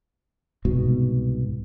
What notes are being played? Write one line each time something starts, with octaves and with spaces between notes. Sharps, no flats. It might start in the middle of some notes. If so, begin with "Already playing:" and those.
C2 G#2 B2